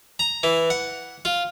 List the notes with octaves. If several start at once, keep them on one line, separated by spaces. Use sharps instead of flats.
A#5
E3
F#5
F4